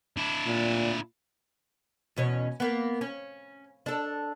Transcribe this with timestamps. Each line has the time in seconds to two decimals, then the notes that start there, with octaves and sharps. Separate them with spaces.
0.17 D4 E4
0.46 A#2
2.16 E2 B2 C#4
2.60 A#3 B3
3.01 C#4
3.86 D4 A4